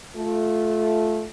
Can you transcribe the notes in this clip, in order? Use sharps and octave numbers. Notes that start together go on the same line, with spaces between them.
A3 F4